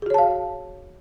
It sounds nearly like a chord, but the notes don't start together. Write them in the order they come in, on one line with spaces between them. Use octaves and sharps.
G#4 F#4 C#5 A5 F5